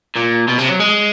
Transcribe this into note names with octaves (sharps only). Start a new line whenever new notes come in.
A#2
B2
C3
F#3
G#3